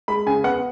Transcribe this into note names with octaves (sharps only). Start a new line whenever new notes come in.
G#3 B5
C#3 G#5
B3 F#5